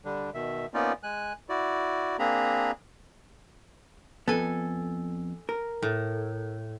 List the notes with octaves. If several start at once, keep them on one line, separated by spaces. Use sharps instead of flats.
D3 G3 D4
B2 D#3 E5
A#3 B3 C#4 D#4 F4 D5
G#3 G#5 F#6
E4 F#4 D5
A#3 C4 D4 G#4 A#5 B5
F2 B3 A4 G#5
A#4
A2